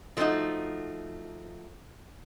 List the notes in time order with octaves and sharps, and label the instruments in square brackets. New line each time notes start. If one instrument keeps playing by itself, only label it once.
[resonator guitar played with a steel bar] F3 G#3 A3 C4 D#4 F#4